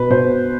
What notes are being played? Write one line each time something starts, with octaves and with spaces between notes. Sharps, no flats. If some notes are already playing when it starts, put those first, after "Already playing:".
Already playing: B2 B4
B2 C5